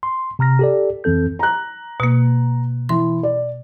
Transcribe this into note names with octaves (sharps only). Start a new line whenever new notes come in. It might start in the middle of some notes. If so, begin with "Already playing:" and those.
C6
C3 A#5 F6 A#6
G4 A4 D5
F2 E3 C4 A4 G6
A#5 F#6
B2 A#3
E3 C6
D5